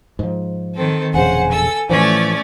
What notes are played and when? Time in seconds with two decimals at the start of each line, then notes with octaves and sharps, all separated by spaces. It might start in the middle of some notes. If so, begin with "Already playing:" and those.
0.19 G#2 F3
0.74 D#3 C4 A4
1.14 E1 A#1 C#3 C5 F#5 G#5
1.50 A4 E6
1.90 A2 E3 F3 A3 C#4 D5